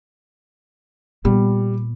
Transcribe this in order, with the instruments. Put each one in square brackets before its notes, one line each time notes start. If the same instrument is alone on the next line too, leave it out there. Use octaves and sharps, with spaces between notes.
[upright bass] A#2 B3 [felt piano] G3